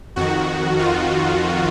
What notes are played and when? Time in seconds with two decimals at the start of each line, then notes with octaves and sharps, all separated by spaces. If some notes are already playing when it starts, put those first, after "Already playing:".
0.16 F2 D#3 F#4
0.79 F4